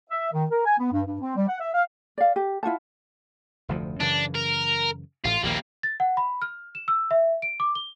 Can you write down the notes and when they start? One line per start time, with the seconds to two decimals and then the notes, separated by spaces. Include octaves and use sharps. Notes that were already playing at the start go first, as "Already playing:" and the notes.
0.10 E5
0.32 D#3
0.50 A#4
0.65 G#5
0.79 B3
0.92 G2
1.06 G2
1.21 C4
1.36 G3
1.48 F#5
1.60 E5
1.74 F5
2.18 D5 F5
2.36 G4
2.63 E4 F4 F#5 A5
3.68 F1 D2 F3
4.01 F#2 C#3 E3 D4
4.35 A#4
5.24 A1 A2 F4
5.43 A#1 D#2 G3 A#3
5.83 A6
6.00 F#5
6.17 B5
6.42 F6
6.75 E7
6.88 E6
7.11 E5
7.42 D7
7.60 D6
7.75 G7